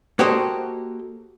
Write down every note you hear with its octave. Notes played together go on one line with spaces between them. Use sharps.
A#3 F#4 G4 A4 C5 D#5